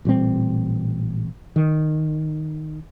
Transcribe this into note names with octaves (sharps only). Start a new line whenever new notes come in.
A1 A#2 G3 C4
D#3